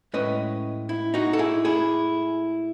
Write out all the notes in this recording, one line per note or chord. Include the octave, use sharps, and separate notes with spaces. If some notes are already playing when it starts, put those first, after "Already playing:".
A2 G#3 C#4 B4 D#5
E4
D#4 F#4
A4
E4 G#4
E4 G#4